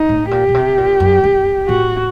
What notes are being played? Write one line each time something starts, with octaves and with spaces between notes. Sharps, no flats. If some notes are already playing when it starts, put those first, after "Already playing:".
Already playing: D#4
A2
A#2 G4
A#2
C3
A#2
F#2
F#2
A2 F#4